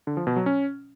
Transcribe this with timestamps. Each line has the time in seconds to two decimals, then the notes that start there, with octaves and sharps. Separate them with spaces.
0.07 D3
0.17 F3
0.27 B2
0.36 F#3
0.46 C#4